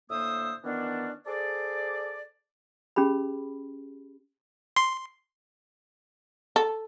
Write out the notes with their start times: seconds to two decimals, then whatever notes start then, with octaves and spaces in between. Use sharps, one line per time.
0.09 A2 D3 A#3 C5 E5 D#6
0.64 D#3 E3 B3 C#4 D4
1.27 G#4 A4 C5 D5
2.96 C#4 G4 G#4 B5
4.76 C6
6.56 A4